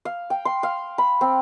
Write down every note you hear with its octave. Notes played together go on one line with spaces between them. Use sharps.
F5
G5
C6
F5
B5
C4